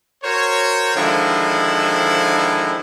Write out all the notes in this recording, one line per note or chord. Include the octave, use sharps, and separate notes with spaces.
F#4 A#4 C5 C#5
D3 D#3 F3 G#3 E4